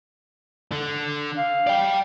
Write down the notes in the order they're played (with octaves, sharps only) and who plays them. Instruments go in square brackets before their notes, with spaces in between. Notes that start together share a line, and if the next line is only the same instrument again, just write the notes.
[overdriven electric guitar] D3
[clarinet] F5
[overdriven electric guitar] D5 G5